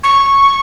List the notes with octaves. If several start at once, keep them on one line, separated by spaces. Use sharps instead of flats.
C#6